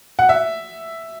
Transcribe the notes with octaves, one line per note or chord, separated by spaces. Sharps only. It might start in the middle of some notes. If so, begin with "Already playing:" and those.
F#5
E5